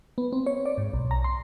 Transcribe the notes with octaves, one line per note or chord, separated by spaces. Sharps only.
B3
C4
C#5
D5
G#2
B1
A#5
C6